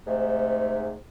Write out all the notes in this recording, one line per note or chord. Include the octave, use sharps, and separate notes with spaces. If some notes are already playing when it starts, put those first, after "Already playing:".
G#2 C3 A3